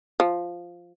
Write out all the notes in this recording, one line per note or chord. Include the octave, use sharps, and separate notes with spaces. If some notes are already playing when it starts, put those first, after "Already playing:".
F3